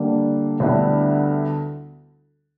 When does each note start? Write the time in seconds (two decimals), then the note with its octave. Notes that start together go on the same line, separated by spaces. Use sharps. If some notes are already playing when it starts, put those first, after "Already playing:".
Already playing: D3 G3 A#3
0.60 D2 D3 G3 B3 E4